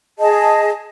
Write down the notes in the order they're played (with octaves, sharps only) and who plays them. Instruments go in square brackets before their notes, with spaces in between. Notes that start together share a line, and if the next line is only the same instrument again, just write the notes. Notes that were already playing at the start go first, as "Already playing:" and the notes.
[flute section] G#4 D#5 A5